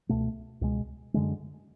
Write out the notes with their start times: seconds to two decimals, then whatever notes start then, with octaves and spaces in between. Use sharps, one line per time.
0.09 C#2 B2 A3
0.61 C#2 B2 G#3
1.14 F#2 D3 G#3